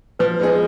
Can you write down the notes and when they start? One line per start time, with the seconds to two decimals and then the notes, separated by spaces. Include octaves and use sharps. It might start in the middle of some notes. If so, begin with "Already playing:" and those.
0.19 F3 B4
0.40 G#3 B3 D#4 G#4